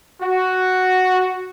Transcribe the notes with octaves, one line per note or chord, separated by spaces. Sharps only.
F#4